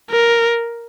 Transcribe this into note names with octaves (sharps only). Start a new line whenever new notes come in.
A#4